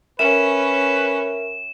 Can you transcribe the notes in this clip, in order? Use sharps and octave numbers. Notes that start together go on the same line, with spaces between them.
C#4 A#4 B4 E5 E7